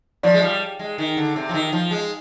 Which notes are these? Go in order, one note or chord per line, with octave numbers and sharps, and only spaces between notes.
F3 D5
G#3
G3
G#3
D#3
D3
C3
F3
D#3
F3
G#3